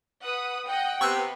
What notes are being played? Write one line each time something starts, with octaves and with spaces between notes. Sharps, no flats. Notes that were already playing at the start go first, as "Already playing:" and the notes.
B4 F#5 D#6
D#5 F#5 G5
C3 B3 C#6 E6 F#6